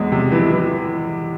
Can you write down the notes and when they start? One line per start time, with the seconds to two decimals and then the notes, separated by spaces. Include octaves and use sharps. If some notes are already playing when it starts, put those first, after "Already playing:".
Already playing: E2 G#3
0.12 C3
0.32 E3
0.51 E3